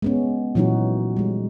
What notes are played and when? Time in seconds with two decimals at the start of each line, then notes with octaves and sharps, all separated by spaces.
0.02 G#3 B3 C#4
0.55 A#2 E3 F#3 C#4 D#4 F#4
1.17 G3 G#3